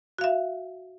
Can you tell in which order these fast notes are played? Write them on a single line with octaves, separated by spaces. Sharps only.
F#4 F5 E5